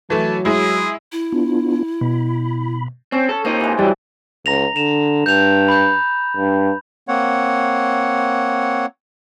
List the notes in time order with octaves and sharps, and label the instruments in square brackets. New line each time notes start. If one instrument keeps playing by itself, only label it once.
[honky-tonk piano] E3 A3 [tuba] F#3 [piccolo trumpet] A5
[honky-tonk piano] G#3 E4 [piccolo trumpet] G#4
[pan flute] E4
[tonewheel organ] B3 D4 F4
[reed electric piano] B2 [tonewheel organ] B5
[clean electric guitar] C4 [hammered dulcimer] C#4
[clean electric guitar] A4
[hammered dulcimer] F3 C4 [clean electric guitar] A#3 D#4
[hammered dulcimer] E3 G#3
[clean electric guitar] E3 F#3 [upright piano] G3 [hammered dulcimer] A5
[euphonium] C#2 [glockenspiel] A#5 A#6 F7
[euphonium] D3 [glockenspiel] E7 F7
[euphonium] G2 [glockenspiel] G6 F7
[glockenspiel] B5 G6
[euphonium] G2
[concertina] A#3 C4 C#5 F#5